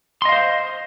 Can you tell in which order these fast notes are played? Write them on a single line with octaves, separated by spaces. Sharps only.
C6 D#5 F5 C5